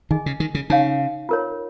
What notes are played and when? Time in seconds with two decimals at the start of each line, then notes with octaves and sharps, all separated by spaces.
0.11 D#3 G#4 D#5 G#5
0.26 C#3
0.40 D#3
0.55 C#3
0.70 C#3 D#4 C#5 F5
1.29 F4 A#4 C#5